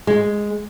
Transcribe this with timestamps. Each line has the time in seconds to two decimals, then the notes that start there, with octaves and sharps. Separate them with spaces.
0.07 G#3